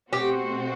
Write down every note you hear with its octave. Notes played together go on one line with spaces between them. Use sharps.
B2 A3 C4 F#4 G4 C5